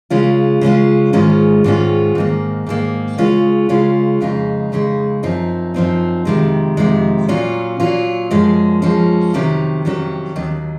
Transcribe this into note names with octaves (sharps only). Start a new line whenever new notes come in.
C#3 G#3 C#4 F4
C#3 G#3 C#4 F4
G#2 D#3 G#3 C#4 F4
G#2 D#3 G#3 C#4 F4
G#2 D#3 A#3
G#2 D#3 A#3
C#3 G#3 C#4 F4
C#3 G#3 C#4 F4
F2 C#3 G#3 D#4
F2 C#3 G#3 D#4
F#2 F3 C4 D#4
F#2 F3 C4 D#4
F2 C3 D#3 G#3
F2 C3 D#3 G#3
A#2 F#3 C#4 F4
A#2 F#3 C#4 F4
F#2 F3 G#3 C#4
F#2 F3 G#3 C#4
F2 C3 D#3 F#3 C#4
F2 C3 D#3 F#3 C#4
D#2 D#3 F#3